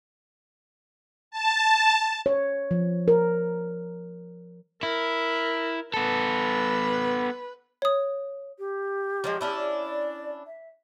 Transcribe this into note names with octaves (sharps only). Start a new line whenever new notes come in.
A5
C#5
F3
A#4
E4 A#4
B3 A4 B4
C#5 D#6
G4
F3 F#3 G#3
C#4 D4 E4
D5
E5